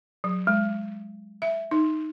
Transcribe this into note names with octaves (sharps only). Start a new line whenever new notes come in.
F#3
G#3
E5
D#4